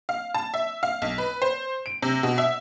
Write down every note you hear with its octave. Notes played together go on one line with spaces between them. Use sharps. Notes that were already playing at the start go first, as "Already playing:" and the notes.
F5
A5
E5
F5
B1
B4
C5
D7
C3
B2
E5